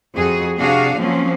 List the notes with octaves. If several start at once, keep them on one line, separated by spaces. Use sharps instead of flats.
F2 F#4 G#4
C3 D4 F#4 G#4 F5
F3 F#3 A#3 C4 C#4